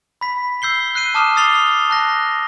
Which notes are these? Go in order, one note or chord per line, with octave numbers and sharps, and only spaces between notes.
B5 B6
E6 G6 C7 G7
F#6 C7 D#7
A5 D6 D#6 F6 E7
D#6 E6 A6 C7 F7 G7
A5 F#6 A#6